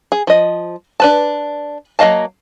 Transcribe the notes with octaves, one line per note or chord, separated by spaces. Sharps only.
G#4
F3 D#5
D4 B4 A5
F#3 A#3 D#5 F5 A5